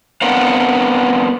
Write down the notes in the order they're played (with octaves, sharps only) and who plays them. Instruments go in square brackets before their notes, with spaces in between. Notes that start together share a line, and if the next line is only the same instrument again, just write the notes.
[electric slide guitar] B3 C4 D4 A#4 F5 F#5